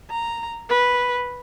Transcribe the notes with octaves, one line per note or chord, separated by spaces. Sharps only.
A#5
B4